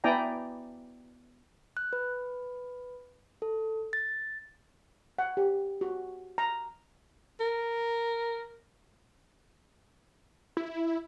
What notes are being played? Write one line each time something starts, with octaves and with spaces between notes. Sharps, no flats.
B3 E4 D5 G5 G#5 A#5
F#6
B4
A4
A6
F#5
G4
F#4
A#5
A#4
E4